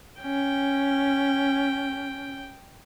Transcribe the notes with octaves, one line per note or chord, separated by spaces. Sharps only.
C#4 G5